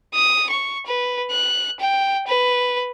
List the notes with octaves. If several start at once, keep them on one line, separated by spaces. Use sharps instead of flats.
D#6
C#6
B4
F#6
G5
B4